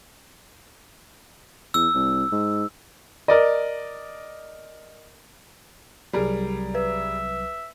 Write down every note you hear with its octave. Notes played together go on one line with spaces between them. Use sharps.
E2 E6
C2
G#2
A#4 D5 D#5
C2 F#3 G3 G#4 A#4
B4 E5